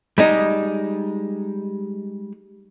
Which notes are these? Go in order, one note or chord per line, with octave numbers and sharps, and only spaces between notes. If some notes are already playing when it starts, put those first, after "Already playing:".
G3 G#3 D#4